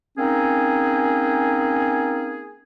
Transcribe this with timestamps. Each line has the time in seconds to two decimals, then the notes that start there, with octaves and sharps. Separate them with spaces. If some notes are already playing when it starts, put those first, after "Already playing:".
0.18 A#3 C4 C#4 D#4 G#4